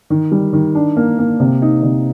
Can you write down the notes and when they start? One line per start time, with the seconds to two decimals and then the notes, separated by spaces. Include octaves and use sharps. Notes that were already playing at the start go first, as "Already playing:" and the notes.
0.10 D#3
0.31 G3
0.53 D#3
0.75 D4
0.97 A#3
1.19 A#3
1.40 C3
1.62 D#4
1.83 C3